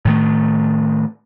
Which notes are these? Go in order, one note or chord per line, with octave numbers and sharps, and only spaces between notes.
A2 D#3 A3